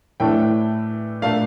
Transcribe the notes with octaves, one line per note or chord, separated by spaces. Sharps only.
A2 E3 A3 D4 G5
A#2 A3 D4 F5